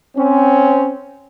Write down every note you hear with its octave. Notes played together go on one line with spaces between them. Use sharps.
C4 C#4